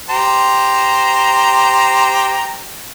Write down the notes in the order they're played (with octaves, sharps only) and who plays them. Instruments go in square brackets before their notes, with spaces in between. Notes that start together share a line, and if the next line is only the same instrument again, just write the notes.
[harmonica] G4 C5 A#5